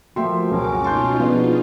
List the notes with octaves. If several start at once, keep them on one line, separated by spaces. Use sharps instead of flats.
F3 A3 A#3 F#4 E5 G5 C6
C#2 F#2 C4 C#4 F#4 A#4 D6
B2 D#4 F4 A5 C6 G6
F3 B3 D4 G#4